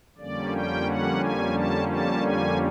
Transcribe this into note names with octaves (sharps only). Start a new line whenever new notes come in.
F2 D3 G3 A#3 C#4 D5
G5
F#5
G#5
A5
A5
G#5